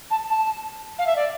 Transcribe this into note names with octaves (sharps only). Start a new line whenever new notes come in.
A5
A5
F5
E5
D5